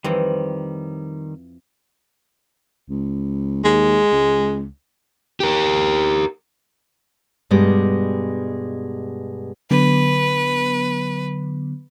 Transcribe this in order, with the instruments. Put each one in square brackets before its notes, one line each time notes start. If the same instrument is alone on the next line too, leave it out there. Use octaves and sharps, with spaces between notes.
[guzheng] F2 E3 C4 [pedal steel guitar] D#3 G3
[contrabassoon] C#2
[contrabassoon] D#2 [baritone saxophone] G#3
[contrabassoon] C#2
[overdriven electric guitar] G4 A#4
[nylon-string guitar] G2 B2 G3 G#3
[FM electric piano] D3 F#3 B3 [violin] B4